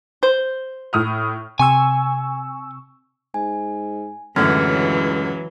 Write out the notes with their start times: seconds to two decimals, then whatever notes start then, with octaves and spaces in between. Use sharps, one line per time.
0.23 C5
0.93 A2 D#6 F6
1.59 C3 G#5 C#6 E6
3.34 G#2 G#5
4.36 C#2 F#2 A2 D3 E3 F#3 F6 G#6